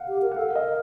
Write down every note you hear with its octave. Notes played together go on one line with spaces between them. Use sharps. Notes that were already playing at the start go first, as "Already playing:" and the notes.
Already playing: F5 F#5
G4
A#4
F#5
A4 F5
A#4
D#5